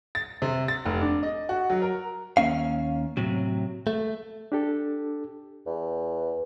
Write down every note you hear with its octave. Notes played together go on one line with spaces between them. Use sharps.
A6
C3
A6
F1
D4
D#5
F#4
F#3
A#4
D#2 A#3 C#4 F5
A2 C3 F#3
A3
D4 G4 A4
E2